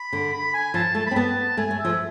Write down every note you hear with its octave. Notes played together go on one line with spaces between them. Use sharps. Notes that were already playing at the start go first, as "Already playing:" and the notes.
Already playing: B5
D3
B5
G#5
F3 A5
A3 A5
C4 B5
B3 A5
A3 G#5
A3
E5
F3